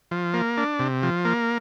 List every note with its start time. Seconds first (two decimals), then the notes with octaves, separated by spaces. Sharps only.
0.11 F3
0.34 A#3
0.58 D4
0.79 C3
1.03 F3
1.25 A#3